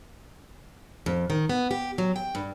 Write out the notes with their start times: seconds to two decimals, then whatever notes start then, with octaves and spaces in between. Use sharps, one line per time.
1.06 F2
1.30 D#3
1.49 B3
1.71 G4
1.98 F#3
2.16 G5
2.35 G2